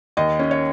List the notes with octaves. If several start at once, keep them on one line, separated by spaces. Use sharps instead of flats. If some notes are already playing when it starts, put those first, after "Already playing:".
D#2 D#5
C#4
C#5